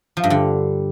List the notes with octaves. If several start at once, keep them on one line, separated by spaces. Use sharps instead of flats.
F3
G2
D3